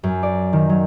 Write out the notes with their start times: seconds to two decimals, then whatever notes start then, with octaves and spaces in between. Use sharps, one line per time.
0.03 F#2
0.23 D5
0.53 D#3
0.70 F#3